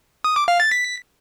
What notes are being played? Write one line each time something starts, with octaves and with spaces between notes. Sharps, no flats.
D#6
D6
F5
A6
B6